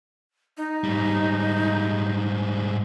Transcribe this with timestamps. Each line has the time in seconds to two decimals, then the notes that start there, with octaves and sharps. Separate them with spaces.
0.57 D#4
0.84 G#2 G3